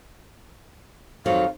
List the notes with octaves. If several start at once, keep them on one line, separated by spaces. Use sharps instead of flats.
F2 D#3 F#3 F5